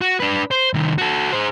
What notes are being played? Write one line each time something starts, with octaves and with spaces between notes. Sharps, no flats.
F#4
D4 B4
C5
C2 D#3
F#4 A4
G#4 C5